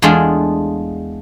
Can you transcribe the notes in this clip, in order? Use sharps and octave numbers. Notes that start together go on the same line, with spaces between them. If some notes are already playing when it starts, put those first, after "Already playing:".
E2 G#3 A3 D4 F4 G#4